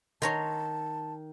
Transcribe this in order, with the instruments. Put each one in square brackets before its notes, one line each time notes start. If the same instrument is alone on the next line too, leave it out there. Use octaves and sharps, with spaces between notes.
[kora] D#3 [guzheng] C#5 A#5 C6 [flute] A5